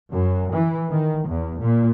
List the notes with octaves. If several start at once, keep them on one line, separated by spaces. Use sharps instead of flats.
F#2
E3
D#3
E2
A#2